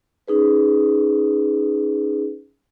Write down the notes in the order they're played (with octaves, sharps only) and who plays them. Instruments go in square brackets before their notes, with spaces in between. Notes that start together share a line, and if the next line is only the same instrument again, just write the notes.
[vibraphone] C#4 D#4 G#4 B4